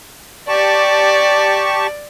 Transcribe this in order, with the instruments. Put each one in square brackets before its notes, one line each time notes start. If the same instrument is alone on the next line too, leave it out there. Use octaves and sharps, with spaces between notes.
[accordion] G4 A5 C#6 [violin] D5